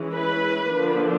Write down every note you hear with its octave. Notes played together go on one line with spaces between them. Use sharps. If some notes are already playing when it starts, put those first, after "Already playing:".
Already playing: E3 G#3 C#4
B4
D3 F3 A#3 D4